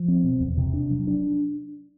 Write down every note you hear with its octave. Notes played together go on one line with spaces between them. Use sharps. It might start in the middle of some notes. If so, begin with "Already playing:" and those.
Already playing: F3
C4
B2
E2
C3
D4
F#3
D4